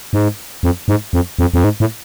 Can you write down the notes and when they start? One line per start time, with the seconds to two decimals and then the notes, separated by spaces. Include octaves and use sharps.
0.13 G#2
0.63 F2
0.88 G#2
1.13 F2
1.39 F2
1.54 F2
1.64 G#2
1.80 A2